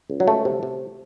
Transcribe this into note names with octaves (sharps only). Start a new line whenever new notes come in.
C#2
F#3
C#2 A3
C3
C3